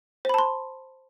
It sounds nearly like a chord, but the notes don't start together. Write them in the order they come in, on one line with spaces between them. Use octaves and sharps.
C5 B5 A5 C6